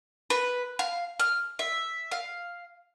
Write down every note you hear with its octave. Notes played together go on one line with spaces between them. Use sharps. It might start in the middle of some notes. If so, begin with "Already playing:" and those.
B4
F5
F6
E5
F5